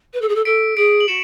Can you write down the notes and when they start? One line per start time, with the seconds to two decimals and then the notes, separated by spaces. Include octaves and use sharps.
0.13 B4
0.21 A4
0.28 G#4
0.35 A4
0.45 A4 B6 D7
0.77 G#4 B6 D7
1.00 F#7
1.08 F#4 C#7 E7